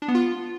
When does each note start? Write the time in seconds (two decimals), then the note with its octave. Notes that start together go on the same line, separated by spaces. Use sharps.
0.02 D4
0.08 B3
0.15 F4